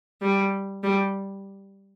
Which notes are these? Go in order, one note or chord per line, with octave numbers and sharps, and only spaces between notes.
G3
G3